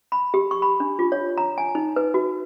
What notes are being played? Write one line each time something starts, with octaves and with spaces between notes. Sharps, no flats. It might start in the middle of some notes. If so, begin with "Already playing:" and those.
B5
G4
C#6
B5
D4
F4
C#5
A#5
G#5
D#4
B4
F#4